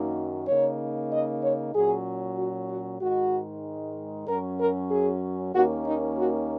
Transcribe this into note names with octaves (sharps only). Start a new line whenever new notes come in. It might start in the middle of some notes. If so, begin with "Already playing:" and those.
Already playing: F#2 D#3 F#3 A#3 D#4
C#3 A#3 D#4 C#5
D#5
C#5
A#2 F#3 C#4 G#4
F#4
F#4
G#2 D#3 G#3 D#4 F#4
F#2 F#3 C#4 A#4
A#4
G#4
D#2 D#3 A#3 C#4 F#4
D#4
F#4